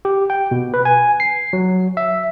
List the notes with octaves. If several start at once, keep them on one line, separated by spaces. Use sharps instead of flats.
G4
G5
B2
B4
G#5
C7
F#3
E5